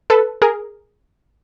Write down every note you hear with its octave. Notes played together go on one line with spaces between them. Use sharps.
A4 B4
G#4 A#4